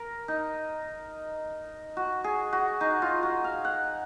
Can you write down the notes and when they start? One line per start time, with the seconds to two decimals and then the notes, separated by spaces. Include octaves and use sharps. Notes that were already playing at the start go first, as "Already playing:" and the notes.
Already playing: A#4
0.28 D#4
1.97 F#4
2.24 G#4
2.53 F#4
2.81 D#4
3.02 F4
3.23 F#4
3.44 F5
3.65 F#5